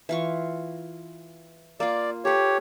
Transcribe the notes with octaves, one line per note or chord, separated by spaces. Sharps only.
E3 F4 C#6
A#3 F4 D5
G4 A4 B4 C#5